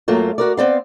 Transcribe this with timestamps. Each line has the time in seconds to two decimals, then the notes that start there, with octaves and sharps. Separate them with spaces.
0.08 F#2 F#3 A3 A#3 F4
0.38 F#4 A#4 D5
0.57 B3 C4 D5 F5